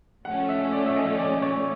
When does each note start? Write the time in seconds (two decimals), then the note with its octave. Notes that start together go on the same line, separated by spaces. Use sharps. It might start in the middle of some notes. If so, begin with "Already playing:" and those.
0.24 A#2 F3 A3 C#4 F#5
0.49 E5
0.72 D5
0.86 E5
0.96 D#5
1.19 D5
1.42 C#5